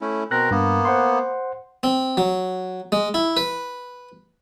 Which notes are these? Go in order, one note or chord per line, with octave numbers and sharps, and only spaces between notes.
A3 C#4 E4
B2 C4 A#4 F#6 A#6
G2 A#3 B3
C5 F#5 C6
C4
F#3
G#3
E4
B4